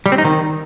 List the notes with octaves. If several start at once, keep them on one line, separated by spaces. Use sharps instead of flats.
G3
C4
D#4
D#3